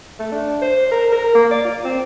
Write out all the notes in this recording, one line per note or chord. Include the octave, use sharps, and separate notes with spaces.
A3
D4
C5
A#4
A#4
A#3
D5
F4
C4